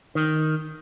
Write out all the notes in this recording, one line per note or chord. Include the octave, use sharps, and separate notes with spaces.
D#3